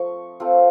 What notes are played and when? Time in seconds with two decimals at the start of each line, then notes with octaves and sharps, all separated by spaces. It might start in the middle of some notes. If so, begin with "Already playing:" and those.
Already playing: F3 A3 C4 F4 C#6
0.40 A3 C4 F4